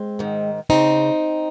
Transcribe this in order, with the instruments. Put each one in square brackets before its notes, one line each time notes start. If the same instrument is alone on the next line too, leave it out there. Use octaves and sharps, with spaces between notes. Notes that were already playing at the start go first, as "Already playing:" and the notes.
Already playing: [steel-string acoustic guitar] G#3 C4
G#2 D#3
C#3 C4 D#4